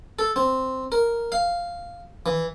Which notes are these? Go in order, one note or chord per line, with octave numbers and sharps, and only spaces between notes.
A4
C4
A#4
F5
E3